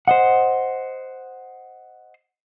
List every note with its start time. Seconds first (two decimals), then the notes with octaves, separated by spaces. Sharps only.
0.08 C5 D#5 F#5